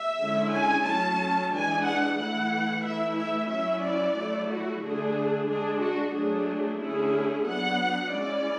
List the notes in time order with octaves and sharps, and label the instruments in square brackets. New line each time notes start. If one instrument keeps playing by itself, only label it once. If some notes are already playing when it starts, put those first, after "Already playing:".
Already playing: [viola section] E5
D3 G#3 C#4 E4
G#5
F#3 A3 C#4 A5
E3 G#3 D4 G#5
F#5
E3 A3 E4 F#5
E3 A3 E4 E5
E5
F#3 C#4 E4 E5
D5
F#3 A3 E4
F#4
D3 A3 D4 G#4
G#3 D4 G#4
F#4
F#3 A3 D4 G#4
D3 A3 C#4 E4 G#4
F#3 B3 D4 F#5
G#3 C#4 E4 D5